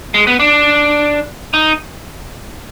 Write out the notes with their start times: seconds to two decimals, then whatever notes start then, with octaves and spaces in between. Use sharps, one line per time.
0.14 G#3
0.27 B3
0.40 D4
1.54 D#4